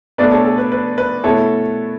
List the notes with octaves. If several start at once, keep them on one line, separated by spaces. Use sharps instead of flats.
B2 A3 D4 B4 D5
A4 C#5
A4
B4
B4
B4
B2 A3 E4 A4 C#5